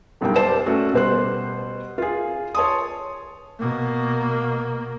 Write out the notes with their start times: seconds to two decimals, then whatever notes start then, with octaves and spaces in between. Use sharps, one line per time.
0.21 F#1 B1 G3 A#3 G5
0.36 C5 D5 A5 E7
0.66 A3 C#4 F#4
0.93 B2 G3 C5 C6 F#6
1.98 F4 G#4
2.55 C#5 A5 C6 D#6
3.59 B2 A#3